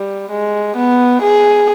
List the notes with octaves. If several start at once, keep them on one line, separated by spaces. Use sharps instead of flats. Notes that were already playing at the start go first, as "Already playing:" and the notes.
Already playing: G3
G#3
B3
G#4